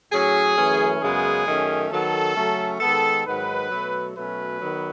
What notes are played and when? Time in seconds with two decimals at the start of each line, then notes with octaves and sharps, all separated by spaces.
0.11 A2 F#3 C#4 G#4
0.56 F#2 E3 A3 C#4
1.00 F#2 C#3 G#3 B3 G#4
1.46 F#2 D#3 A3 C#4
1.91 D#3 F#3 B3 A4
2.35 C#3 F#3 A3 C#4
2.80 D#3 G#3 B3 A4
3.26 G#2 D#3 F#3 B4
3.70 B2 F#3 A3
4.15 B2 F#3 A3 C#4 B4
4.60 D#3 F#3 B3